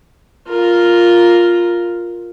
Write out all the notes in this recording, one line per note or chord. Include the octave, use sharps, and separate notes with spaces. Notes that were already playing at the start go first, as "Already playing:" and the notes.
F4 A#4